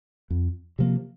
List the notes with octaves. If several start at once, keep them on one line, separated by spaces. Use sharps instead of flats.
F2
C3 F3 A#3